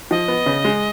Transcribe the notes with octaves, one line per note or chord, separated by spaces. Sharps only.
F3 D#5
B3
C#3
G#3